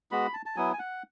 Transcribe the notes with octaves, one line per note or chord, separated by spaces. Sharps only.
G#3 B3 F#4 B5
A5
A5
F#3 B3 E4 G#5
G#5
F#5